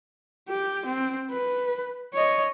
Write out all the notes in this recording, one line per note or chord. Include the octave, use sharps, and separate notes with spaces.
G4
C4
B4
C#5 D#5